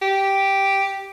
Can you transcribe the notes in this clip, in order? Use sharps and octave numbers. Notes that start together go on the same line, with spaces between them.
G4